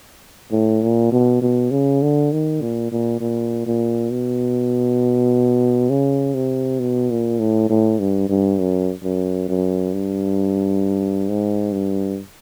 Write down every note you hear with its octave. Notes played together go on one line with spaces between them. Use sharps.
A2
A#2
B2
B2
C#3
D3
D#3
A#2
A#2
A#2
A#2
B2
C#3
C3
B2
A#2
A2
A2
G2
G2
F#2
F#2
F#2
G2
G#2
G2